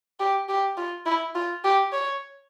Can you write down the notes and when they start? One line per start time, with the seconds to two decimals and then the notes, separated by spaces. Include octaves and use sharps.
0.20 G4
0.49 G4
0.77 F4
1.06 E4
1.35 F4
1.64 G4
1.93 C#5